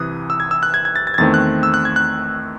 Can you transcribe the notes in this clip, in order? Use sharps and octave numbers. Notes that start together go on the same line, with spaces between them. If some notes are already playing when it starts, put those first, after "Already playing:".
Already playing: C2 C3 E3 D#6 F#6
E6
G#6
E6
F#6
G#6
G#6
A6
A6
G#6
E2 D#3 A3 C4 A6
F#6
E6
F#6
G#6
F#6